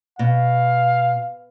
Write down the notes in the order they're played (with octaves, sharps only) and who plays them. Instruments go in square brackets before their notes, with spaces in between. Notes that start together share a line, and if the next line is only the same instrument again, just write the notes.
[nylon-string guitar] B2 [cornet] F5